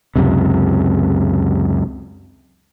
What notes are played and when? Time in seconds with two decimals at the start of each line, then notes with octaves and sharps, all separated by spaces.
0.16 C#2 F#2 C3